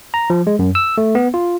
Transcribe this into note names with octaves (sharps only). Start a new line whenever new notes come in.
A#5
F3
G#3
F#2
E6
A3
B3
F4